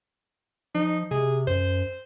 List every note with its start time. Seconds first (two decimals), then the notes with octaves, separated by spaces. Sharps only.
0.75 F3 D#4
1.11 C3 G#4
1.47 F#2 C5